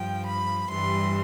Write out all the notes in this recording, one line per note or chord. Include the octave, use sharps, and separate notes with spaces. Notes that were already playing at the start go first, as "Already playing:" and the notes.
Already playing: G2 F3 G5
B5
G2 E3 G3 C6